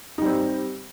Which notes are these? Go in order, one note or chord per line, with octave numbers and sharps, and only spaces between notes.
G3 C4 D#4